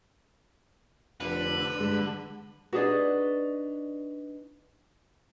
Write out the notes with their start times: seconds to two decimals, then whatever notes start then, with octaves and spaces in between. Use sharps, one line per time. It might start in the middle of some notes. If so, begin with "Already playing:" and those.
1.21 F1 D3 B4
1.80 G2 G#3
2.73 D4 D#4 F#4 G#4 B4 D5